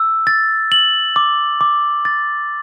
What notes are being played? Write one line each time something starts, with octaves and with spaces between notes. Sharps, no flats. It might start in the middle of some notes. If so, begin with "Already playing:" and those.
Already playing: E6
A6
F#7
D6
D6
A6